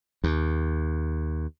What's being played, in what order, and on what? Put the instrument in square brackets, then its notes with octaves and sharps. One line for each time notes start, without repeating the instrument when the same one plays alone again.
[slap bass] D#2